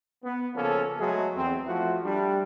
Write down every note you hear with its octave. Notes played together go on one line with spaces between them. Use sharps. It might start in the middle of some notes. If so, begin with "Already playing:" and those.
B3
C#3 F3 A#3 C#4 A4
F#3 G#3 A3 B3 F#4 G#4
E2 C4
F3 A3 E4 F#4
G3 D4